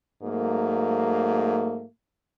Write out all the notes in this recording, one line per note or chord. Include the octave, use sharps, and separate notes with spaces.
G#2 F#3 A3 A#3